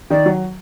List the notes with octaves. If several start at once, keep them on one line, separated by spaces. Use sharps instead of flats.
D#3 D5
F#3